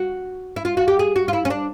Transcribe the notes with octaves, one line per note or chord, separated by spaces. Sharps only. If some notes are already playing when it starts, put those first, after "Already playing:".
Already playing: F#4
E4
F4
F#4
G4
G#4
F#4
F4
E4
C#4
D4